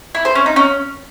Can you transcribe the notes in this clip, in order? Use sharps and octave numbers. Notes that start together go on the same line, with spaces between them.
E4
C5
C#4
D#4
C#4